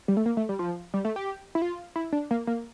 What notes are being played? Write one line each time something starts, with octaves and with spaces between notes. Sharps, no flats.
G3
A3
A#3
A3
G3
F3
G3
A3
G4
E4
F4
E4
D4
A#3
A#3